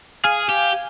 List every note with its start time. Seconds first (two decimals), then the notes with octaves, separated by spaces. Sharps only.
0.24 G#4 F5 G#5
0.49 G4